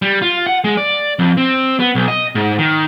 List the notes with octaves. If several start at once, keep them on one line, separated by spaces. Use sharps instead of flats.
G3
F4
F#5
G#3
D5
F2
C4
B3
B1
D#5
G#2
D#3